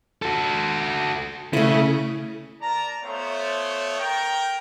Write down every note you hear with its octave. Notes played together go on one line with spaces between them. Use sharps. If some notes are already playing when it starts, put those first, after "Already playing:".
F#4 A4
C#3 A3 E4
A#4 D5 A5 A#5
A3 B3 F4 C5 C#5
A#4 G5